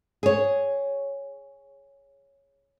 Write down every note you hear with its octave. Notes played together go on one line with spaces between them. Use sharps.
G#4 C#5